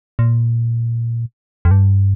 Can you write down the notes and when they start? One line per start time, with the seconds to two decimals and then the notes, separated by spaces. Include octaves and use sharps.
0.19 A#2
1.65 F2
1.71 G2